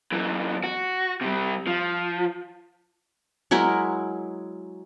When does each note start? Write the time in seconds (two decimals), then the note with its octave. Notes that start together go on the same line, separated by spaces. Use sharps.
0.12 F#2 E3
0.64 F#4
1.21 C3 G3
1.67 F3
3.51 F#3 G#3 E4 A#4